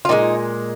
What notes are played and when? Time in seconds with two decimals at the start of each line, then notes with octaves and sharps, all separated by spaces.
0.05 F4
0.09 A#2 F3 G#3 D#4